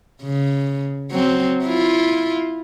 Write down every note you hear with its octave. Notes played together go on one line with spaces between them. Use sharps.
C#3
F#3 C4
E4 F4